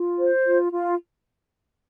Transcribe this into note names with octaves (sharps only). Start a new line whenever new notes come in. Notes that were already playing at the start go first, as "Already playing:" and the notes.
Already playing: F4
C5
F4
F4